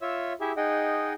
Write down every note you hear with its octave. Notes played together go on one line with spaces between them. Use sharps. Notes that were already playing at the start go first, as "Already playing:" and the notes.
F4 C#5 E5 E6
E4 G4 G#4 E5
D#4 G#4 D#5 F#5 G5